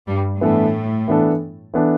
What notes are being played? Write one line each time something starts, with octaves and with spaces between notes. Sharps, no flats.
G2 G3
A2 E3 A3 B3 D4 A4
E3 B3 D4 A4
E3 B3 D4 A4